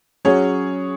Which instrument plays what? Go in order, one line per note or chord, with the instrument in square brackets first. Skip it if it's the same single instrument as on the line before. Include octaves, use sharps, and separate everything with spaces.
[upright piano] F#3 C#4 F#4 [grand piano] G#4 C#5